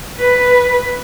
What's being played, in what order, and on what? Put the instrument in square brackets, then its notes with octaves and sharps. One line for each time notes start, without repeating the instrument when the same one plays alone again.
[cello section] B4